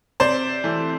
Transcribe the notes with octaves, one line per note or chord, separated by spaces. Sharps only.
C3 C5 D5
E3 A3